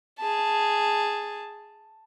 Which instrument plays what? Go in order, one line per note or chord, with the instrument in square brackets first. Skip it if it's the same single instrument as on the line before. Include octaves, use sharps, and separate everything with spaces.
[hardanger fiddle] G#4 A5